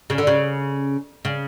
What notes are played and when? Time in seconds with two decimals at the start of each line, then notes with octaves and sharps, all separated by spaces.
0.10 C#3
0.18 D3
0.27 C#3
1.25 C#3